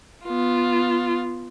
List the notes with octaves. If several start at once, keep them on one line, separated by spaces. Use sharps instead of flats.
B3 F4